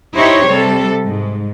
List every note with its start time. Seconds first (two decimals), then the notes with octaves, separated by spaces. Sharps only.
0.16 D#4 E4 G4 C5 C#5
0.46 C3 G3 A4
1.04 G#2